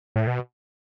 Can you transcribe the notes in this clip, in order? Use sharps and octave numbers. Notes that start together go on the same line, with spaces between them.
A2
B2